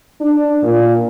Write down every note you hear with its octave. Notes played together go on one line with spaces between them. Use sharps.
D4
A#2